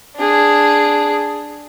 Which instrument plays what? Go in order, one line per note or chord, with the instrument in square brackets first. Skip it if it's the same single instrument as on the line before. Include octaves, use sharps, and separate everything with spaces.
[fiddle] D4 G#4